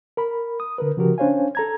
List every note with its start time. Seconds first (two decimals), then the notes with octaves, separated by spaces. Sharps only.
0.17 A#4 B5
0.60 D#6
0.78 D3 A#4 B4
0.97 C#3 F3 F#4 G4 A#4
1.18 C#4 D4 C5 C#5 F5 G#5
1.55 A4 A#5 G#6